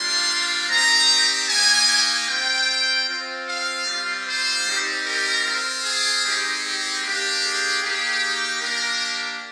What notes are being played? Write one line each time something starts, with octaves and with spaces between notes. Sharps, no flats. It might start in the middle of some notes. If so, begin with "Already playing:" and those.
Already playing: G3 A#3 D4 F4 C6
C4 D#4 G4 A#5
A#3 D#4 G4 G#5
C4 F4 G5
C4 F4
F5
G3 C4 F4
C5
G3 C4 D#4 G4
A#4
C4 F4
G#4
G#3 C4 D#4 G4
G4
A#3 D4 G4
G#4
A#3 D#4 G4
A#3 D4 G4 A#4